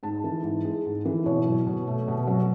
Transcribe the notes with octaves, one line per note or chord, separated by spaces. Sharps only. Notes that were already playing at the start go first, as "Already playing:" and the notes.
G#2 A5
E3
G#2
G#3
G#2
E3
B2 C#5
F#3
B2
A3
B2
F#3